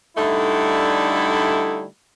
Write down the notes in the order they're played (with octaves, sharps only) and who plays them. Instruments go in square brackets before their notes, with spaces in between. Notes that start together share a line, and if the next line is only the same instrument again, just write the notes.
[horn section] D3 G3 A3 D#4 E4